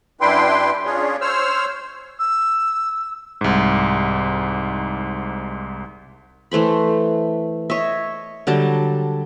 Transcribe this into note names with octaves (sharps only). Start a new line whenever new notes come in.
F#2 D4 E4 B4 G5 C6
C#4 D4 F4 G#4 C#5
C5 C#5 E6 F6
E6
C2 G#2
E3 A3 C5 B5
C#5 D#5 E5
D3 F#3 G3 A5